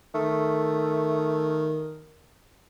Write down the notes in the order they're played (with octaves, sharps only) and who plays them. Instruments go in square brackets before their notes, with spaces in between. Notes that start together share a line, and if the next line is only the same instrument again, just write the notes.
[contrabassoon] D#3 [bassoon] A3